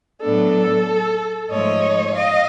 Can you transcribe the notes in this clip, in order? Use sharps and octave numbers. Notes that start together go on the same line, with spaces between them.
A2 F#3 B3 D4 A4
G#2 F3 A3 C#5 D#5
D#5 F5